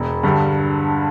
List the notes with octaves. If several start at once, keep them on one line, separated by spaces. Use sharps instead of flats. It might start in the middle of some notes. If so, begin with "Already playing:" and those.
Already playing: E1
G2 D3 G3